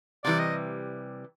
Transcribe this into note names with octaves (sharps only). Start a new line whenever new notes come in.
C3 E3 G3 D5
D#5